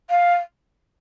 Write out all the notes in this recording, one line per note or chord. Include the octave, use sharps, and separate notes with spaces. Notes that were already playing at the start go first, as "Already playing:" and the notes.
F5